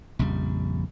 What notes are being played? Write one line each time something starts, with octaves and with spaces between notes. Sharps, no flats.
A#1 F2 C#3 G3